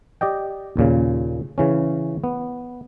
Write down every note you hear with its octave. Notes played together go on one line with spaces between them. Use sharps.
G4 D5 D#5 G5
D#2 A#2 C#3
C#3 E3 C#4
B3